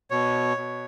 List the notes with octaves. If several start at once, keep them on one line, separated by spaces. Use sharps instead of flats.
B2 C#5
B2